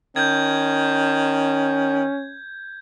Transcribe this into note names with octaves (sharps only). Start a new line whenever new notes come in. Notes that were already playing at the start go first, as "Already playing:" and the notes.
D#3 C#4 G6 G#6